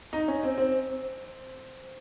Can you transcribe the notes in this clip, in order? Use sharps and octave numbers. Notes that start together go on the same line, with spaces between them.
D#4
C#4
C4
C4